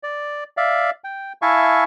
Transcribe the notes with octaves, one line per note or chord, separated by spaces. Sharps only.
D5
D5 E5 F5
G5
E4 E5 F5 G#5 A5 C#6